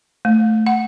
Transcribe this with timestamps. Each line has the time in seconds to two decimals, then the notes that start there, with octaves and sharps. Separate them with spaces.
0.25 A3
0.66 F#5